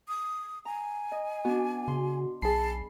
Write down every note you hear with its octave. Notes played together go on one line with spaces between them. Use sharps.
D#6
G#5 A#5
D#5
B3 D4 F#4
C#3 C6
B1 G#4 A5 B5 C7